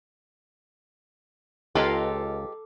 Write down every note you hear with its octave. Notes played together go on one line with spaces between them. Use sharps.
C#2 G#3 F4 G4 A4 B4 F5 A#5